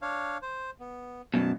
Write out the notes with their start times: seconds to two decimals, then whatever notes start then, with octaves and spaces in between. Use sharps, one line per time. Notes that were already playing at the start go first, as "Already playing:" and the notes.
0.02 D4 C#5 F5
0.42 C5
0.80 B3
1.34 F#2 B2 A5